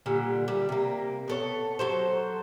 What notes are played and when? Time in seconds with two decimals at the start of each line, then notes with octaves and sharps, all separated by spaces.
0.06 A#2 D3 G3
0.48 G3
0.69 C3 A#3
1.28 B3 A4 C#5
1.79 F#3 A4 C5